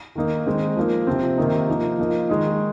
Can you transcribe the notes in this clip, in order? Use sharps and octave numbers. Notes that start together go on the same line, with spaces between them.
D#3 A#3 D#4
D#3 G#3 C4 D#4
F3 A#3 D#4
C3 F3 C4
C3 D#3 A#3 D#4
F3 A#3 D#4
F3 A#3 D#4
D#3 G#3 D#4